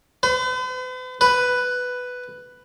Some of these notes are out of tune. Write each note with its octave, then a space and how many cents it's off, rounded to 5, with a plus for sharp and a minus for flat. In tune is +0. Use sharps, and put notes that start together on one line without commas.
B4 +45
B4 +5